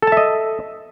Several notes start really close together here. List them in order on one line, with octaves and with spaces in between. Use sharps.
A4 A5 E5 D#5